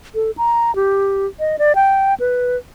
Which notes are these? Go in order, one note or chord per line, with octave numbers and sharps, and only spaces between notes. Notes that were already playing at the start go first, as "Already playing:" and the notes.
A4
A#5
G4
D#5
D5
G5
B4